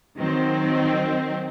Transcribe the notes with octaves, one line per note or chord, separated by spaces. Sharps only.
D#3 F#3 C4